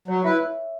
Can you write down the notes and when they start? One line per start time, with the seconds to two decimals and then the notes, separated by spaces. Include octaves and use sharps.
0.08 F#3 C#5
0.24 E4 B4 E5